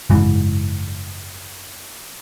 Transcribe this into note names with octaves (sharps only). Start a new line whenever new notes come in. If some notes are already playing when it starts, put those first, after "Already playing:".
F#1 G#2 E3